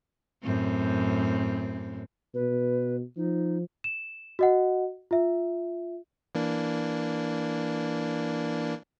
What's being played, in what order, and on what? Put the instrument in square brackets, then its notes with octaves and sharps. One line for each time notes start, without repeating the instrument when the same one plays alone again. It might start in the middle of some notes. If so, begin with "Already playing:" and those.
[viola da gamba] F#2 A2 C4
[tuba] B2 [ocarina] B4
[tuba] F3 [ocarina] D#4
[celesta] E7
F#4 D#5 F#5
F4 E5
[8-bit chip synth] E3 A#3 D4